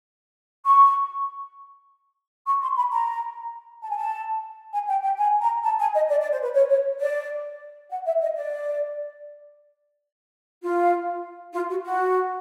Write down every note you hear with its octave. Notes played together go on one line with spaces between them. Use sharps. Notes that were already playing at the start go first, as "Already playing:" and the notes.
C#6
C#6
C6
B5
A#5
A5
G#5
A5
G#5
G5
G5
G#5
A#5
A5
G#5
D#5
D5
D5
C5
B4
C#5
C#5
D5
F#5
E5
D#5
D5
F4
F4
F#4
F#4